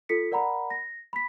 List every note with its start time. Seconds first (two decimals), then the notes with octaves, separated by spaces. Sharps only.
0.09 F4 A4 B6 C#7
0.32 A#4 D5 F#5 A#5 B5
0.70 A#6
1.13 B5 B6